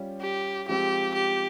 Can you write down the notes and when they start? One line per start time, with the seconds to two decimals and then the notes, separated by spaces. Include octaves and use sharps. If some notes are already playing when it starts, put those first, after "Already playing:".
Already playing: G3 C#4 F4
0.21 G4
0.68 F3 G#3 C4 G4
1.15 G4